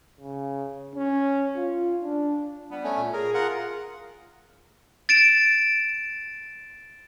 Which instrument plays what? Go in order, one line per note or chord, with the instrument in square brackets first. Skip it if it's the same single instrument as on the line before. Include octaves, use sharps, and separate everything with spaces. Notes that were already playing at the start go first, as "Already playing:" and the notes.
[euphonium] C#3
C#4
F4
D4
[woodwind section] G3 B3
[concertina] A3 C#4
[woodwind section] A#2
[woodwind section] G#4 [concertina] A#4
[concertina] F4 A#4 F#5
[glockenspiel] A6 D7 E7